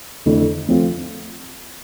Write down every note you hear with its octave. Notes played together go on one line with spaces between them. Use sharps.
F2 D3 A3 E4
F3 A3 C4 F4